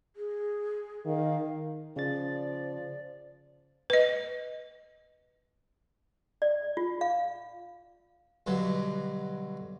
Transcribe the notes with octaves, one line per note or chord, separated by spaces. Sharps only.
G#4
D#3 F5
C#3 F3 D5 A6
B4 D#5
D5
F4
F5
G2 B2 D3 F#3